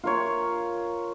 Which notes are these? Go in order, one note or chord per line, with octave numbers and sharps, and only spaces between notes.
F4 A#4 C#5